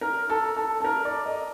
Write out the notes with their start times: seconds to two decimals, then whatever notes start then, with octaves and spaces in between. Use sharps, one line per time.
0.01 A#4
0.30 A4
0.57 A4
0.80 A4
0.84 A#4
1.05 D5
1.26 D#5